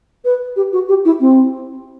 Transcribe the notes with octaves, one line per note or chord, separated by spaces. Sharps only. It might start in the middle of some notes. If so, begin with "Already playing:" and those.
B4
G4
F#4
G4
E4
C4